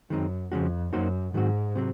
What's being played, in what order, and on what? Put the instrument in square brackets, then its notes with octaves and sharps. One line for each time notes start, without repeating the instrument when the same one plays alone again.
[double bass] F#2 [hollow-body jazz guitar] D#3 G#3 C4 D#4
[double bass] F2 [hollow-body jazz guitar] C#3 F3 G#3 C#4 F#4
[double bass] F#2 [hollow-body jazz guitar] A#3 D#4 F#4 C5
[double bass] G#2 [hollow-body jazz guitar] D#3 F#3 C4 F#4
[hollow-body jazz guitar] C3 F#3 C4